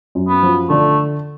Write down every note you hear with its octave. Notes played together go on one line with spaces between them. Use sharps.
F#2
B3
F3
D3 A3